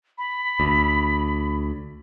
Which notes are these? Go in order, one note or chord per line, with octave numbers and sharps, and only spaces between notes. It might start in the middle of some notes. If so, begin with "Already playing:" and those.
B5
D2